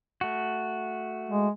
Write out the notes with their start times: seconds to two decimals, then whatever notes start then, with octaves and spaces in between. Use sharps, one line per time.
0.21 A3 F#4
1.29 G#3